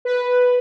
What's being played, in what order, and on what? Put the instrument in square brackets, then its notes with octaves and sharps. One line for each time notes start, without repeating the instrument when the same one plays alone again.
[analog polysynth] B4